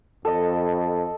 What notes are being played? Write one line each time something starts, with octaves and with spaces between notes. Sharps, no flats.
F2 A4 D#5